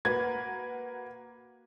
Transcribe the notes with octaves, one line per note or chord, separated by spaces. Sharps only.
A#3 F#4 B4 G#6